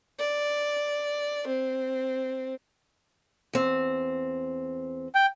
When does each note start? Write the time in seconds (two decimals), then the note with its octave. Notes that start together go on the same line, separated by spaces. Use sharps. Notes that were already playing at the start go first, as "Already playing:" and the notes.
0.20 D5
1.47 C4
3.53 E2 C4
5.15 G5